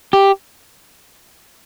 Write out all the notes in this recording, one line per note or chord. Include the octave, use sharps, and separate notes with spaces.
G4